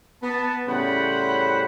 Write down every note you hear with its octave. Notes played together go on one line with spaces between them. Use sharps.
B3 A5
A2 C#3 G3 C5 F#5 B5